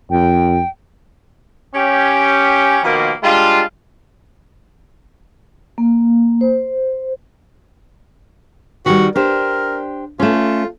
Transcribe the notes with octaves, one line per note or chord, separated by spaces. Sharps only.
F2 G5
C#4 G4
B2 D#3 F3 A#3
G3 G#3 D4 F4
A#3
C5
D#3 G3 F#4
D4 G4 A#4 C5
A3 C#4 F4